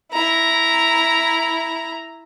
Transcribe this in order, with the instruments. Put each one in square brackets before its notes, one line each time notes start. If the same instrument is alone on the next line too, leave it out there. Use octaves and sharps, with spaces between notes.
[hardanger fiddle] E4 A#5